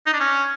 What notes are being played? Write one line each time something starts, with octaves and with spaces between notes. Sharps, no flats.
D#4
D4
C#4